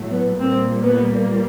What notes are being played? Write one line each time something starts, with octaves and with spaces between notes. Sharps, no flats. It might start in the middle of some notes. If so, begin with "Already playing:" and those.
Already playing: A2 F#3 A3
B3
A#2 G3 A#3 C4
B3